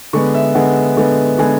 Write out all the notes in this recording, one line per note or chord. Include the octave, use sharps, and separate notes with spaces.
D3 G#3 B3 C#6
E5
D3 G#3 B3 F#5
D3 G#3 B3
D3 G#3 B3 G#5